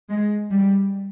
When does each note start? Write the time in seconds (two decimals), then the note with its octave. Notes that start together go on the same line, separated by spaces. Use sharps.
0.10 G#3
0.50 G3